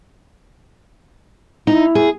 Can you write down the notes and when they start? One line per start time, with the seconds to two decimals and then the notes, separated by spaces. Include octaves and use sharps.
1.67 D#4 E4
1.95 G#4